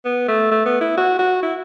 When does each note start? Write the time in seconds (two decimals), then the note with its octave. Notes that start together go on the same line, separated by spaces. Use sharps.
0.05 B3
0.28 A3
0.51 A3
0.66 B3
0.81 E4
0.97 F#4
1.19 F#4
1.43 E4